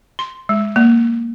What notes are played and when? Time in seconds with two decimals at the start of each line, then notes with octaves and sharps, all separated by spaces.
0.19 C6
0.49 G#3
0.76 A#3